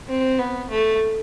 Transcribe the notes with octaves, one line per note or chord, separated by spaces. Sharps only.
C4
B3
A3